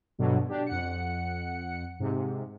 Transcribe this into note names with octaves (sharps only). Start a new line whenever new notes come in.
G2 B2 D3 F#3
D4 G4
F2 F#5 C#7
G#2 C3